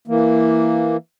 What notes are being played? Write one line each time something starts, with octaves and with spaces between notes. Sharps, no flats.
E3 A#3